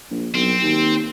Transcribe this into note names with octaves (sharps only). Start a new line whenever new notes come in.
A#1
B1 C4
D#2